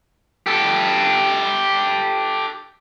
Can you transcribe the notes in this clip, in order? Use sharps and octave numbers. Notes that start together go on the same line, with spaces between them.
G4 A4